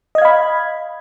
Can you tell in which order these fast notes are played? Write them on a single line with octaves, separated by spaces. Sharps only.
D#5 G#6 F5 B5